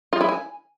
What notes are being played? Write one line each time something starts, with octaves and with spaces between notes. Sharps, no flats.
F4
E4
G#5